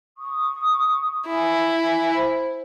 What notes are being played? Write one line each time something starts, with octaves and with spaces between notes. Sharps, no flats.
C#6 D#6
E4 G#5
C5